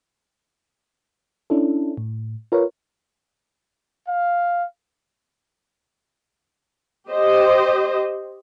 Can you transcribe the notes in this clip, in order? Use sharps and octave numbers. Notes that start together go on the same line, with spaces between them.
C#4 D4 E4 A4
A2
F4 A#4 B4 C#5
F5
G4 C5 D#5